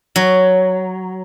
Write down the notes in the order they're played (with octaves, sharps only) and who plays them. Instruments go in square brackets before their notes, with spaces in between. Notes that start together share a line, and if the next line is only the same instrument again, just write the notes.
[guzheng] F#3